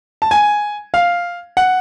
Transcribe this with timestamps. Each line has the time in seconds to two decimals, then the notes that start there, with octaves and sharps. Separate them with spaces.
0.22 A5
0.31 G#5
0.94 F5
1.57 F#5